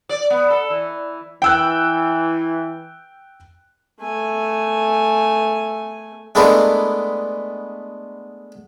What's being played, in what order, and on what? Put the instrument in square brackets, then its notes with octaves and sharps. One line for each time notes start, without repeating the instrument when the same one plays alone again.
[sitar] D5
B3
A4
E3
[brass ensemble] E3 [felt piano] G5 E6 F#6
[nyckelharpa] A3 G#5
[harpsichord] G#3 A3 B3 D4 E4 A#4